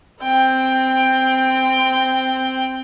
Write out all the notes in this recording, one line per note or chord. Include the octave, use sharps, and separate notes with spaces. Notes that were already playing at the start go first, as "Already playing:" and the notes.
C4 G5